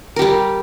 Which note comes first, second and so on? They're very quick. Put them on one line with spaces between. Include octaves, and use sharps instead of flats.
A#4 G4 G3